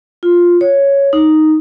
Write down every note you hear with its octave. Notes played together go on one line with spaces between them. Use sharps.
F4
C#5
D#4